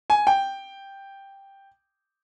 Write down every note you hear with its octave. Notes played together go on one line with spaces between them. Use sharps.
G#5
G5